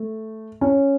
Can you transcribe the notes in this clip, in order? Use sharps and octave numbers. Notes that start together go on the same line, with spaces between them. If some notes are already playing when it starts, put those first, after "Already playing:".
Already playing: A3
C#4